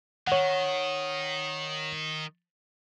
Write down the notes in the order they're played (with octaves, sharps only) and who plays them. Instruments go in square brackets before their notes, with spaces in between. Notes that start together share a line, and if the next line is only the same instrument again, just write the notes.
[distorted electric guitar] D#3 [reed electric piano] C#5 F#5